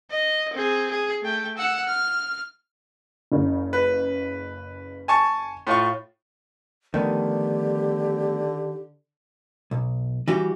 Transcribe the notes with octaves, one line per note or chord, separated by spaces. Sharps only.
D#5
C4 G#4
G#4
A3 G5
F#5 E6
F6
F#1 C#3
B4
G#5 A5 C#6
A2 F4 C#6
D3 D#3 F3 A3 B3 G4
B1
E3 G3 F#4 G4